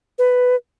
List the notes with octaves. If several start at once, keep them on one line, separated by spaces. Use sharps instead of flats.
B4